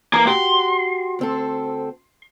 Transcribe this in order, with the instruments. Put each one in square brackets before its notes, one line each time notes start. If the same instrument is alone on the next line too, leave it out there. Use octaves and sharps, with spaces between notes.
[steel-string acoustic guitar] E3 [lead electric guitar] A#3 A#5
[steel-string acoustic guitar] F#4 G4 [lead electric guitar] C6
[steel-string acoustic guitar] D2 C4 A4